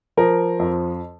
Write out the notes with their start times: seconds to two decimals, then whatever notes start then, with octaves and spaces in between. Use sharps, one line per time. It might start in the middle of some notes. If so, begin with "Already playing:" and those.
0.17 F3 A#4
0.59 F2